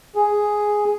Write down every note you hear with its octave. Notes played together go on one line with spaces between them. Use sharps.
G#4